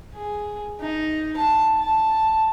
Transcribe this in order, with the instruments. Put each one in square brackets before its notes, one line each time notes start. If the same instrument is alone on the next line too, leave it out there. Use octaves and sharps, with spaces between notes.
[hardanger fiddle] G#4
D#4
A5
A5